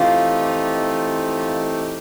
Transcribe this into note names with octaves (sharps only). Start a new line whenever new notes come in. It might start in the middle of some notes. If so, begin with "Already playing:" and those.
Already playing: E3 A3 C4 D#4 F4 G4